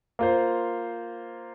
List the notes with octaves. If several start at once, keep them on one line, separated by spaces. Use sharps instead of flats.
A#3 F4 C5